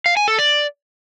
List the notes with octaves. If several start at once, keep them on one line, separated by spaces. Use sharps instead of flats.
F5
G#5
A4
D5